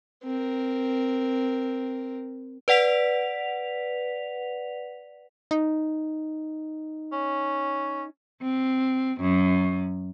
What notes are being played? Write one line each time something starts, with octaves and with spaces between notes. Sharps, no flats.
C4 A#4
B4 D5 F#5 B6 F7
D#4
C#4
C4
F#2